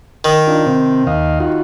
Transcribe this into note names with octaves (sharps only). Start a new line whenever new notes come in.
D#3
D4 D#4 F4
C3 C4
D#2 D#5 F5
D#4 F4 F#4